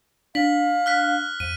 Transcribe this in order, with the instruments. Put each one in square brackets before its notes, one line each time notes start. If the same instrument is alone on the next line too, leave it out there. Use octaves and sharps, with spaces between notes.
[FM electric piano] D4 [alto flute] F5 [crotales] B6 F#7
[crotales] F6 F#6 B6
[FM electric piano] F2 [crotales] D#7